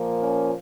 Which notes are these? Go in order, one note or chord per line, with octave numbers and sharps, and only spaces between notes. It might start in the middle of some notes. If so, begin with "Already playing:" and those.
Already playing: A#2 F3 A#3
C#4